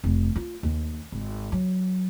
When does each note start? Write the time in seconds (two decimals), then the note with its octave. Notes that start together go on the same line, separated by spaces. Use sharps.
0.04 F1
0.36 F4
0.63 D#2
1.12 G#1
1.52 F#3